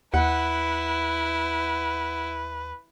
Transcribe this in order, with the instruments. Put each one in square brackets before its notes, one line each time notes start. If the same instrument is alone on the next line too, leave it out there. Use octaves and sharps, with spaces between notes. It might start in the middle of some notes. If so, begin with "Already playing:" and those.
[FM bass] D#2 [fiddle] E4 [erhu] B4 [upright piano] F#5